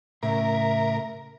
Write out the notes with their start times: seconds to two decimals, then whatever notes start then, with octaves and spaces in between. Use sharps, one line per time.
0.23 A2 C#3 A#4 E5